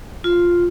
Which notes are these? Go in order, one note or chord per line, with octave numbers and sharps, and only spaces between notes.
F4